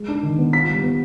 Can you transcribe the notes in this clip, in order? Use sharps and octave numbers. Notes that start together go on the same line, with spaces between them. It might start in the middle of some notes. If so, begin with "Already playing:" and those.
Already playing: G#3
D4
D#3
B3
F4 B6
G3
B3